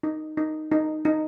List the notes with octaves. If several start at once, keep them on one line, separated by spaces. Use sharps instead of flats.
D#4
D#4
D#4
D#4